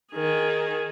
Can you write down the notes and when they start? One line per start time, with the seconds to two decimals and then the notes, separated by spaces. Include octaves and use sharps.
0.13 D#3 G#4